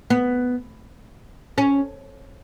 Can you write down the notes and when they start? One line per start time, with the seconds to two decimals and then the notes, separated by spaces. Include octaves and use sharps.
0.10 B3
1.58 C#4